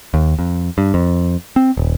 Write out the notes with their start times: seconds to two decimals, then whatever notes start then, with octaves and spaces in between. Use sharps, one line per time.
0.14 D#2
0.39 F2
0.78 G2
0.94 F2
1.56 C4
1.77 D#1